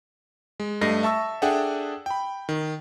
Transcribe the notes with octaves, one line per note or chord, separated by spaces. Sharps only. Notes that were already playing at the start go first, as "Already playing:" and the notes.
G#3
G2 A3 D#5 A#6 C7
E5 A5 C#6 E6
D4 G#4 A4 E5 F#5 G5
G5 B5
D#3